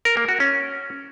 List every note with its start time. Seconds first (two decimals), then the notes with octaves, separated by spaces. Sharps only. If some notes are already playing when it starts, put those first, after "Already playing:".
0.05 A#4
0.17 A#3
0.29 F#4
0.40 C#4